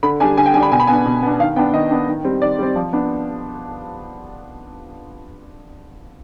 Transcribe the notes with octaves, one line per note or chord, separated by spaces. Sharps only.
D3 B5
G3 D4 G#5
D3 G#5
G5
G3 D4 G#5
B5
B2 G#5
B5
B3 D4 G#5
B2
B3 D4
D#3 F5
B3 D4 G5
D#3 D#5
B3 D4
D#3
G3 C4
D#3 D5
G3 C4
F3
B3 D4